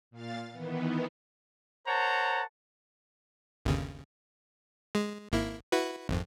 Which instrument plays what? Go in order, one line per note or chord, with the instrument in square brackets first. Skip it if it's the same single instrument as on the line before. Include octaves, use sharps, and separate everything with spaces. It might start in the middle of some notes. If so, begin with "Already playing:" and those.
[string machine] A#2 F5 A6
D#3 E3 B3
[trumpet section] A#4 C5 C#5 F#5 A5 A#5
[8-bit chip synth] G1 D#2 C#3
G#3
G#1 A#3 E4
E4 F#4 B4
G#1 F2